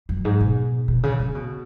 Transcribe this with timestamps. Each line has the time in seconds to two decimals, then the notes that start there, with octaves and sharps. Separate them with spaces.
0.09 F#2
0.25 G#2
0.40 B2
0.88 B2
1.03 C#3
1.19 C#3
1.35 B2